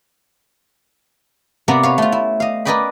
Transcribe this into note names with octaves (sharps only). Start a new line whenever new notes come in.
C3 B3 A#4 D5 F5 F#5
B4 C#5 F5
A3 F4
E4
D#5 F5
A#4 B4 D5 D#5 G5 B5